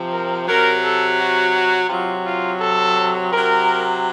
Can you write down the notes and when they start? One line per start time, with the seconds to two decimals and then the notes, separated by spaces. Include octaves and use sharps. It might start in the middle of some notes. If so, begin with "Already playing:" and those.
Already playing: C3 F3
0.12 A#4
0.48 C3 F#3 A#4
0.84 A4
1.19 F#4
1.55 F#4
1.89 C3 F#3 F4
2.26 F4
2.60 A4
3.31 C3 F#3 A#4